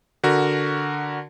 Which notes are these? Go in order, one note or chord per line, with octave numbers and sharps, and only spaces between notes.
D3 F#4 A#4